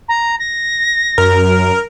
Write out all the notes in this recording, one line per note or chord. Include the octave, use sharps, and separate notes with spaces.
A#5
A#6
F#2 A#4